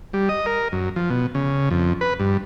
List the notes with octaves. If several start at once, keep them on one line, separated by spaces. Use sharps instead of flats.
G3
D#5
A#4
F#2
F3
B2
C#3
F2
B4
G2